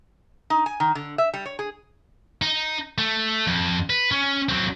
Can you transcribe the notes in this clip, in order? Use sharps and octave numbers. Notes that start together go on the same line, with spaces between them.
D#4
G#5
D#3
D3
E5
G3
C#5
G#4
D#4
A3
F2
B4
C#4
F#3 C4